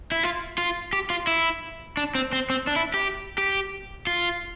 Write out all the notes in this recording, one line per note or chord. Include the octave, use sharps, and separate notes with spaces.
E4
F4
F4
G4
F4
E4
D4
C4
C4
C4
D4
E4
G4
G4
F4